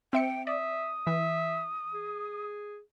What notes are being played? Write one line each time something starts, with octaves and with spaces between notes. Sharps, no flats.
C4 E5 G5 C#7
D5 E5 D#6
E3 E5
G#4